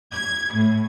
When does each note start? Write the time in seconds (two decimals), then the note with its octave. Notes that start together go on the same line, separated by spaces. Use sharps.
0.14 G#6
0.53 A2